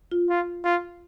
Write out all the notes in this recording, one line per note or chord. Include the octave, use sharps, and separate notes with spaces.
F4
F4
F4